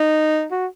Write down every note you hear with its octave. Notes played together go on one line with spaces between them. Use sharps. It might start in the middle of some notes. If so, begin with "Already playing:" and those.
Already playing: D#4
F#4